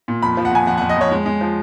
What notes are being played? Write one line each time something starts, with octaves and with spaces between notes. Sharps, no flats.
A#2
F2 B5
F3
F#5
F2 G#5
F2 F#5
F2 F#5
D#5
F2 C#5
G#3
G#3
F3